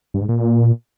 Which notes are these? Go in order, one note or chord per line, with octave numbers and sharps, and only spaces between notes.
G2
G#2
A#2